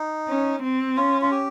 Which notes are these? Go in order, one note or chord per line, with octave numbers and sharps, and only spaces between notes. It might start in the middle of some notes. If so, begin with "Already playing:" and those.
Already playing: D#4
C#4
C4
C#4 F4
F4
G4